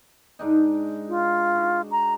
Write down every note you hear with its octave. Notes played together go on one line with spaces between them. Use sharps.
G#2 D4 D#4
F4
F#4
A#5